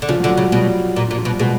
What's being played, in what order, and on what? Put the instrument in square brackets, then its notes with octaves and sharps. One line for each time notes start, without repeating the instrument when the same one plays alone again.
[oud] D3
[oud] C#3 [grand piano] F3
[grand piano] F#3
[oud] D3
[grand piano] F#3
[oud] C#3
[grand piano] G3
[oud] B2 [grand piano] G3
[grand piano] G3
[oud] A#2
[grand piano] F3
[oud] A#2
[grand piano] F3
[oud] B2
[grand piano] G3
[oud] B2 [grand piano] G#3